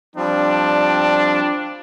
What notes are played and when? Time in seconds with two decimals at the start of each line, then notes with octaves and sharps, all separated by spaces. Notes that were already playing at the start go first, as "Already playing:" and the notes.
0.16 F3 G3 C4 D4